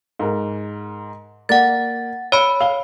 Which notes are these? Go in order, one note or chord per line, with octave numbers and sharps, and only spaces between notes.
G#2 A#4
A#3 D5 F#5 A6
C#5 B5 E6 C#7 D7
F5 G7